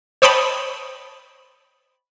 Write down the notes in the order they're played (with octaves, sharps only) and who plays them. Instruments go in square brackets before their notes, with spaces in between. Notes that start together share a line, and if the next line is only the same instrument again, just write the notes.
[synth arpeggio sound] C5 C#5 D#5 G5 A5 B5